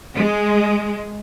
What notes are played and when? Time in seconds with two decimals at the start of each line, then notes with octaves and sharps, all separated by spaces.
0.15 G#3